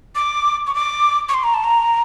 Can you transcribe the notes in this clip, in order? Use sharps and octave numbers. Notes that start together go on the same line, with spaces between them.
D6
C#6
D6
C#6
C6
A#5
A5
A#5